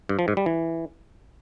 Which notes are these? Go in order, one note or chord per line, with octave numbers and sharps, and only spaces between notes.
G2
F3
G#2
G3
E3